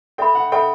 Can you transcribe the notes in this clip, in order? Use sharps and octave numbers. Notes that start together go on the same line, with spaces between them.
A4 E5 G5 B5
F#5
A4 E5 G5 B5